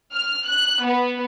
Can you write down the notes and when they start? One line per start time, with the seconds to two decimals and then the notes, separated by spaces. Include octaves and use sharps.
0.16 F6
0.48 F#6
0.85 B3